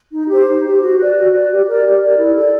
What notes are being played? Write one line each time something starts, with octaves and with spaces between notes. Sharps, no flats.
D#4
G4 C5
D#4
G4 C5
F#4
B4 D5
F#4
B4 D5
G4
A#4 D5
G4
A#4 D5
E4
A4 D5